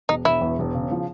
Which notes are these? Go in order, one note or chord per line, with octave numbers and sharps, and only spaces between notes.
E1 D#4
E1 E4
E2
E1
C#3
F3